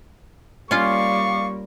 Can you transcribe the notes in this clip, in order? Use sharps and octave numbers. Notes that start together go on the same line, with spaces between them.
G3 A#3 C#4 F4 D5 F5 C#6 D6